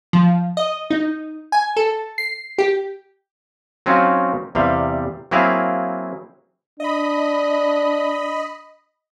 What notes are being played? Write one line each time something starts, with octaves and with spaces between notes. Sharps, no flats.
F3
D#5
D#4
G#5
A4
C7
G4
F#3 C4 C#4 D#4 F4 F#4
E2 C3 G3 F5
F#3 A#3 C4 E4 G#4 F5
D4 D#5 B5